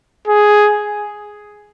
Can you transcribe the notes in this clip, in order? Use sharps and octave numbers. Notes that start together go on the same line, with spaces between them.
G#4